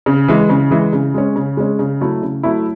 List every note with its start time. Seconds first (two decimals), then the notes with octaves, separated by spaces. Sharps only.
0.06 C#3
0.28 E3 G#3
0.49 C#3
0.70 E3 G#3
0.93 C#3
1.14 G#3 C#4
1.36 C#3
1.57 G#3 C#4
1.79 C#3
2.01 F#3 A3 E4
2.22 C#3
2.43 F#3 A3 E4